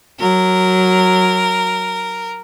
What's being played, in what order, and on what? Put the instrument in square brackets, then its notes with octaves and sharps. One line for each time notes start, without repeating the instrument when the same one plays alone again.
[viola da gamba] F#3 [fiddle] A#4